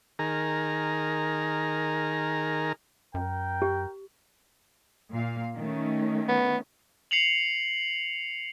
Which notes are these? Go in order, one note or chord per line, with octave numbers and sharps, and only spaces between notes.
D#3 G#4 A#4 A#5
F#2 A#4 G5
G4
A#2 F5
D#3 A3 C#4
B3
C7 C#7 F7 F#7